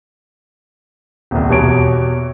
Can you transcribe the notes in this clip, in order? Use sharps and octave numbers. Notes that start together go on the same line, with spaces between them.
D#1 C2
E2 B2 G4 C#5 D7